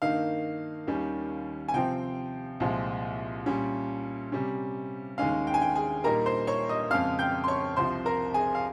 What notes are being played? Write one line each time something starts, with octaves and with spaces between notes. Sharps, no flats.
G2 D#3 A#3 D#4 F5
D#2 D#3 G3 C#4
G#5
C3 F3 C4 G5
C2 A#2 F3 G#3
A#2 G3 C#4
C3 G3 C#4
D#2 D#3 G#3 C#4 F5
G5
G#5
G5
G#4 G#5
A#2 G3 A#3 D#4 A#4 A#5
C5 C6
C#5 C#6
D#5 D#6
F2 C#3 G#3 C4 F5 F6
G5 G6
C6
C#5 C#6
C2 C3 F3 C5 C6
A#4 A#5
G#4 G#5
F5